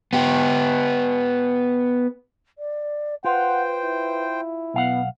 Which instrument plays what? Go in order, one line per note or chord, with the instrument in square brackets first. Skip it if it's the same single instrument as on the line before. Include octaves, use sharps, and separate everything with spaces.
[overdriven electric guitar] B3 G4
[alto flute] D5
[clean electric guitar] F4 [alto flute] B4 [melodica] C5 G5 [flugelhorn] F#5
[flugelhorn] E4
[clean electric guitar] B1 F5 F#5 [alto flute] B3